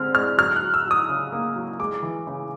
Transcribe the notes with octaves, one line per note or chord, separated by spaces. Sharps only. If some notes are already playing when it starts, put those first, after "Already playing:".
Already playing: D3 G#3 C4 F6
G#3 F6
F#3 F6
F#6
F#3
E6
F#3 D#6
C#3
A#3
F#3
G#3 D6
E3
C#3